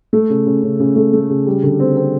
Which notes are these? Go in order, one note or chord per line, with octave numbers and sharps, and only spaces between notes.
A3
C#3
C#3
C#3
C#3
A3
A3
C#3
G3
D3
C4
C4